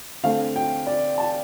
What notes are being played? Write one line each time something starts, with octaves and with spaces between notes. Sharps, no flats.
D3 A3 C4 F5
G5
D5
A5